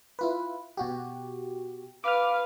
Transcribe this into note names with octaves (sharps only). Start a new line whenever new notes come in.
E4 F4 B4
B2 F#4 G4
B4 F5 D6 F6